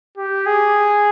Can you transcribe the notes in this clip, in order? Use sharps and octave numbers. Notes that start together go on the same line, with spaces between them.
G4
G#4